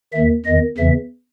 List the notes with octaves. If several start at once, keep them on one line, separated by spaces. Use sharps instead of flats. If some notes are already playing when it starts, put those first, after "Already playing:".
D#2 D#3 E5
E2 D#3 D#5
E2 C#3 E3 E5